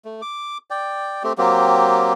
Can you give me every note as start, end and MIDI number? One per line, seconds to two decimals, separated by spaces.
0.05 0.21 57
0.22 0.58 86
0.70 1.23 74
0.70 1.23 79
1.23 1.33 57
1.23 1.33 60
1.23 1.33 67
1.38 2.13 54
1.38 2.13 58
1.38 2.13 60
1.38 2.13 67